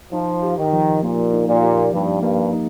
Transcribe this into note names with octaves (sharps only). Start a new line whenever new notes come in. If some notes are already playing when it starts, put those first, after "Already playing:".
F3 D#4
G4
D#3
F3
A#2 A#3
D#4
A#2
G4
G2 F3
G2 A#3
D#4